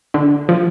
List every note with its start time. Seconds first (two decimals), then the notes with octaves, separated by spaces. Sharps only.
0.14 D3
0.49 F3